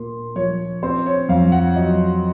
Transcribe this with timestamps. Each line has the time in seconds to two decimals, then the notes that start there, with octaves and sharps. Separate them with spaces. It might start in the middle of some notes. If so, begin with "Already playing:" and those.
Already playing: A#2 A#3 C6
0.36 F3 C#5
0.83 C4 C5
1.06 C#5
1.29 F2 F5
1.52 F#5
1.76 F#3 D#5